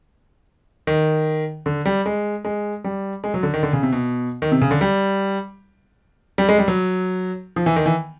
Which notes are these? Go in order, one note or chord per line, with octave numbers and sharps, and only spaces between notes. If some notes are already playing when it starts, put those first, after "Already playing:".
D#3
D3
G3
G#3
G#3
G3
G#3
F#3
D3
D#3
D3
C#3
C3
B2
D#3
C3
C#3
D3
G3
G3
G#3
G3
F#3
F3
E3
D#3
E3